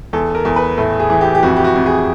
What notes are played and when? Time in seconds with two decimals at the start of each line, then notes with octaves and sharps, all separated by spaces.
0.13 E2 A4
0.35 A#4
0.45 E2
0.56 B4
0.78 A2 A4
1.00 G#4
1.10 E3
1.21 G4
1.35 G4
1.43 F2 F#4
1.56 G4
1.64 F#4
1.76 F2
1.86 G#4